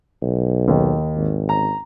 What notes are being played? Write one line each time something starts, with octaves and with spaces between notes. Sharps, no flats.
B1
D#2
G#1
A#5